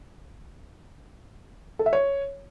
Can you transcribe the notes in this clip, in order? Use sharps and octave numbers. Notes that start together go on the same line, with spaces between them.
A4
E5
C#5